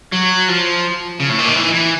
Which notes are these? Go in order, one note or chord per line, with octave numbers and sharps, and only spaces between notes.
F#3
F3
C#3
A2
A#2
D#3
E3
E3